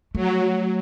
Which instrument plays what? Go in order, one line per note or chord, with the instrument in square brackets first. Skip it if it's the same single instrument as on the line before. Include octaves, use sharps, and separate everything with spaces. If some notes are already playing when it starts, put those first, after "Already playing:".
[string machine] F#3 [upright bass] A3